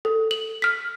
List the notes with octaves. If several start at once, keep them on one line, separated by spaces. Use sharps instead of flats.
A4
F#7
F6 B6